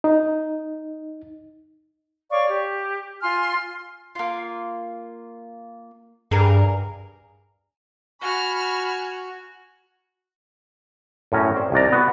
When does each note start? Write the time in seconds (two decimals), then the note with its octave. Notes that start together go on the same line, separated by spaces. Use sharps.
0.04 D#4
2.31 C#5 D5 F5 C#6
2.47 G4
3.22 F4 G#5 C6 F6
4.15 A#3 F4
6.31 G2 G#4 A#4
8.22 F#4 G#5 B5 C#6 F6
11.32 F#2 A2 C#4 A#5
11.56 C4 C5 D5
11.72 C2 D#3 D5 A#5
11.92 B3 F#4